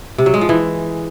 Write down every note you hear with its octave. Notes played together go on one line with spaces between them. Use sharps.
C3
F#3
G#3
F3
E3